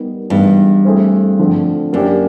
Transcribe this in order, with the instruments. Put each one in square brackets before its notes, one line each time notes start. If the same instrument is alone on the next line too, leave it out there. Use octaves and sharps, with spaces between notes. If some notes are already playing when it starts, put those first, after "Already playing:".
Already playing: [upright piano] G3 B3 D#4 G4 A#4
[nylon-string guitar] G2 [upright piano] E3 G#3 B3 D#4
[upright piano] A3 C4 E4 G#4 C5
D3 F3 A3 C4
[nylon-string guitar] F#2 [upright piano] A#3 D4 G4